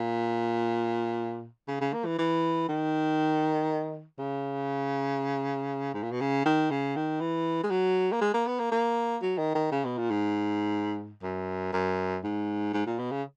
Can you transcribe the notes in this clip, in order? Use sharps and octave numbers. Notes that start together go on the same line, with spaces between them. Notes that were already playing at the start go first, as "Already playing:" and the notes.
Already playing: A#2
C#3
C#3
A#3
E3
E3
D#3
C#3
G#2
A#2
B2
C#3
D#3
C#3
D#3
E3
G#3
F#3
A#3
G#3
A#3
B3
A#3
A#3
F#3
D#3
D#3
C#3
B2
A#2
G#2
F#2
F#2
G#2
G#2
A#2
B2
C#3